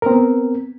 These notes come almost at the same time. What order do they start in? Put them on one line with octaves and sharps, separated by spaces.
A#4 C4 B3